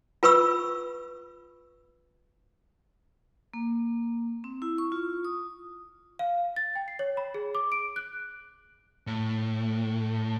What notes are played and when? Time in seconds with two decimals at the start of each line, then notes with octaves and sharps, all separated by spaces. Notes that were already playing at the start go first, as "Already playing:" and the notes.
0.23 F4 B4 B5 C#6 E6
3.54 A#3
4.44 C4
4.62 E4
4.78 C#6
4.92 F4
5.25 D#6
6.19 F5
6.56 A6
6.75 G5
6.88 C7
6.99 C#5
7.17 B5
7.34 G#4
7.55 D6
7.72 D7
7.96 F#6
9.07 A2